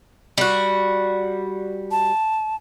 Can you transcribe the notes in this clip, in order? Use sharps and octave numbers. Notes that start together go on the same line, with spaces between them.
G3 F#4
A5